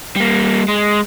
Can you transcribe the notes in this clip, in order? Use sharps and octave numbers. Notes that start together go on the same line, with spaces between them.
G3 A#3
G#3